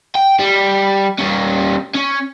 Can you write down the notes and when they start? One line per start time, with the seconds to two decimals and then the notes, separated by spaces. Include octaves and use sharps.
0.15 G5
0.39 G3
1.19 G3 C#4
1.95 C#4